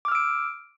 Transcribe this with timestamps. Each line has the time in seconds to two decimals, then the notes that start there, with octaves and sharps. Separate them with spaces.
0.05 D6
0.08 F6
0.12 E6
0.15 D7